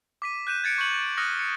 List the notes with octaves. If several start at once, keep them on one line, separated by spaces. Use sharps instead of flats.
D6 B6 D#7
F#6 G6 D#7 E7
G#6 A6 C#7 D7
C#6 G6 C#7 F#7
D6 D#6 F6 F#6 A#6 C#7
C#7